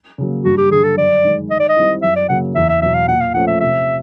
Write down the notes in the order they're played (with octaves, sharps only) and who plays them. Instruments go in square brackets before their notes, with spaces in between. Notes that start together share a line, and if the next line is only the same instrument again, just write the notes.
[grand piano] C#3 F#3 A#3
[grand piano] G2 [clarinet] F#4
[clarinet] G4
[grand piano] D3 G3 [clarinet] G#4
[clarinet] A4
[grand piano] F#2 [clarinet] D5
[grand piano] D#3 G#3
[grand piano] D#3 [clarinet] D#5
[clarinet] D5
D#5
[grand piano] G3 C4 E4
[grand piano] F#2 [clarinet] E5
[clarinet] D5
[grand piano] C#3 F#3 A#3 [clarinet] F#5
[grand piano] E2 [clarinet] E5
[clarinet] E5
[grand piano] B2 F#3 [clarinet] E5
[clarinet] F5
[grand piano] A#2 [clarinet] F#5
[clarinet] F5
[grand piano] F3 A3 C#4 [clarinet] F#5
[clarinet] E5
[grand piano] C3 [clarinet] E5